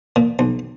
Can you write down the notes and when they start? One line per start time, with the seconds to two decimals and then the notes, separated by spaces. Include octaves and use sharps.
0.16 A#2
0.39 B1